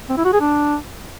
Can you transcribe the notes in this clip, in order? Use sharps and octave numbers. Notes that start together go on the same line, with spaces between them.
C4
E4
F#4
G#4
D4